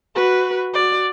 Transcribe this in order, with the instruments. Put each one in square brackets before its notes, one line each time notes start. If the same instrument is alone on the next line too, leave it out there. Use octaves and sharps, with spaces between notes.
[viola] F#4 B4
F#4 D5